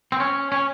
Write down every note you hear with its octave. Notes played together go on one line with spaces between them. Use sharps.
C4
C#4
C#4